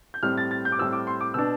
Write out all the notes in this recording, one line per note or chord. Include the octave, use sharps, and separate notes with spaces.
G6
A2 G3 C4 F6
A6
A6
G6
D6
A2 G3 C4 E6
D6
C6
D6
B2 B3 D4 E6